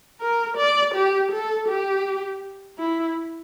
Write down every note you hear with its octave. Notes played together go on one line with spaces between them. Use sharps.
A#4
D5
G4
A4
G4
E4